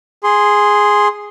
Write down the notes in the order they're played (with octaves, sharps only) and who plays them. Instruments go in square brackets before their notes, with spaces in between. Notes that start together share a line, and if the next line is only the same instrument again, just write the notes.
[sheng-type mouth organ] G#4 C6